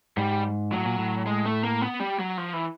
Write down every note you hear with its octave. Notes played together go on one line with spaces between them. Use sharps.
G#2 G3
A2 F#3
A#2
A2
G#3
A3
A#3
B3
G3
F#3
F3
E3